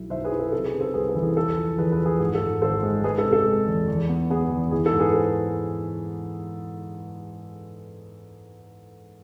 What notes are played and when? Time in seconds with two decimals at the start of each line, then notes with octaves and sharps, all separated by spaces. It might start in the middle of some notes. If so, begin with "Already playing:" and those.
Already playing: B1 E4
0.10 B1 C5 E5
0.24 G#4 B4
0.32 E4
0.39 A4
0.52 C3 A4
0.66 G#4 B4
0.73 C3
0.80 A4 C5
0.94 C2 G#4 B4
1.08 A4
1.15 E3
1.23 G#4
1.36 E2 A4
1.58 F3
1.78 E2 G#4 B4
1.92 G#4 B4
1.99 F3
2.06 G#4
2.20 G#2 G#4
2.35 A4
2.41 G#2
2.62 G#1 A4 C5
2.83 G#3
3.04 G#3 G#4 B4
3.18 A4
3.25 C3
3.33 A4
3.46 G#3
3.67 E2
3.88 E2
4.09 B3
4.30 B3 G#4
4.50 E2
4.71 E3 G#4
4.86 A4
4.92 G#2
5.00 G#4 B4
5.14 A4 C5